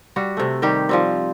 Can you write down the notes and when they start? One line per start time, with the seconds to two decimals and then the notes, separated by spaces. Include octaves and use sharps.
0.16 G3 F#4
0.37 C3 A3
0.62 D#3 G3 G4
0.89 F3 G3 C4